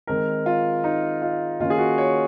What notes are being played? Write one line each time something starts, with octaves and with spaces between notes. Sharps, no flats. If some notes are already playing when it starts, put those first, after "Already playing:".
D#3 G#3 C4 A#4
F4
D#4
F4
D#3 A#3 C#4 F4
G#4
F#4
C#5